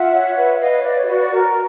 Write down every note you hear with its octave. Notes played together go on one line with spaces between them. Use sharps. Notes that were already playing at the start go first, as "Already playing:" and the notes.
Already playing: F4 E5 F#5
C#5
B4 E5 F#5
F#5
B4 D#5 F5
C#5
B4 D5
C#5
F#4 D5
D5
A#4